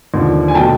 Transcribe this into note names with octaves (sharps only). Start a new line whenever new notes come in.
D#2 D3 F3
G#5
B2 F#3 A3 G5 A5